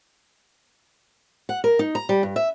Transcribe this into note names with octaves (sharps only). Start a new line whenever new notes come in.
F#5
A#4
D#4
A#5
G3
G2
E5